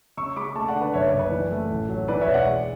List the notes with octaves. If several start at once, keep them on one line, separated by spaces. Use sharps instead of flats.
C#3 C#6 E6
G#3 B5 D6
A3 A5 C#6
D5 F#5
D3
B4 D5
F#1 C#5 E5
B4 D5
F#1
B4 D5
E3
A3
A1
F#3
E3 B4 D5
C#5 E5
E1
D5 F#5
G#3